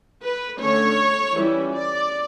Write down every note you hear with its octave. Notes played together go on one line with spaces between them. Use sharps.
B4
D3 A3 C#4 C#5
E3 G3 C#4 E4
D5